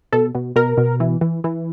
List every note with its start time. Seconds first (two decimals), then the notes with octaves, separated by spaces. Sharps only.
0.13 B2 A4
0.35 B2
0.56 B2 A#4
0.77 B2
1.00 E3
1.21 E3
1.44 E3